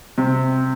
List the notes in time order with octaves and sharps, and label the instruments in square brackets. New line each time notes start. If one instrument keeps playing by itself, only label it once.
[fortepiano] C3